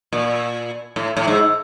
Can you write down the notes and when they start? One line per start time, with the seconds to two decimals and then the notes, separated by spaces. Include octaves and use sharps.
0.13 A#2
0.96 A2
1.17 A2
1.28 G#2